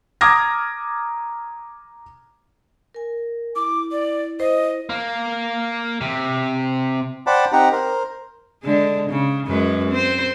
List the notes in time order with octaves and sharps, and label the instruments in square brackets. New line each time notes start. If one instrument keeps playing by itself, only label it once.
[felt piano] A#5 D6 D#6 F6 G#6 A#6
[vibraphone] A#4 G#5
[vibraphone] E4 [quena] D6
[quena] D5
[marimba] C5 [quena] D#5
[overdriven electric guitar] A#3
C3
[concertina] C5 D5 F#5 G5 A5 B5
C4 D#4 G4 F#5 A#5
A#4 C5
[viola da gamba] D3 G#3
C#3
F#2 G#3 B4
C4 C5